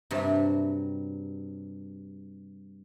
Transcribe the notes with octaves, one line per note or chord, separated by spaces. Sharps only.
G2 C3 F#3